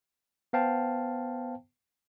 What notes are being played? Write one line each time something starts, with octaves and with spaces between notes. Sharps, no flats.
B3 C5 F5 G5 A5